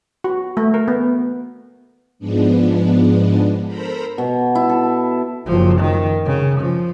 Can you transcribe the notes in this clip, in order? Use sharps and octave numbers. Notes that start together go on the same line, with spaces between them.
F#4
A3
A#4
B3
G#2 F3 G#3 B3 D4
A4 A#4 C5 A#5 B5
B2
E4
A4
F#1 F3
D#3
C#3
F3